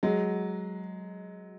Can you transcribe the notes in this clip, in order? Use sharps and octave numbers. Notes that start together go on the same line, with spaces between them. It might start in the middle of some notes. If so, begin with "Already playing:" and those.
F#3 G#3